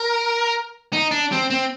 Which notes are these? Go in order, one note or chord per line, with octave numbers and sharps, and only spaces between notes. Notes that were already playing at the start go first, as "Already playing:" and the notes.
Already playing: A#4
D#4
D4
C4
C4